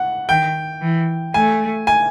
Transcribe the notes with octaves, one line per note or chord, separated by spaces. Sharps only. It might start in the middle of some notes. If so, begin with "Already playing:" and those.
Already playing: F#5
D#3 G5
E3
A3 G#5
G#5